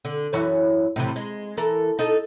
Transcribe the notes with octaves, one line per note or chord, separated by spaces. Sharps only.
D3
F#2 E3 C#5
A2 C3 E3
G#3
E3 A4 A#4
D#4 A4